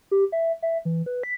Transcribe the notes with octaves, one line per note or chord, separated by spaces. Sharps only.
G4
E5
E5
E3
B4
B6